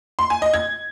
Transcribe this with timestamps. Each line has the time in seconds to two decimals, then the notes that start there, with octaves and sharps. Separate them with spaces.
0.19 C6
0.30 G#5
0.42 D#5
0.54 G#6